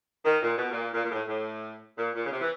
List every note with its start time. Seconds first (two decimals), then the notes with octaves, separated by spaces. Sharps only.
0.24 D#3
0.42 A#2
0.56 B2
0.70 A#2
0.94 A#2
1.04 A#2
1.11 A2
1.27 A2
1.97 A#2
2.14 A#2
2.25 C#3
2.32 C3
2.40 E3